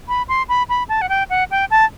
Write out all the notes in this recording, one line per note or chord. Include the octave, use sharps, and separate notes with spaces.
B5
C6
B5
B5
A5
F#5
G5
F#5
G5
A5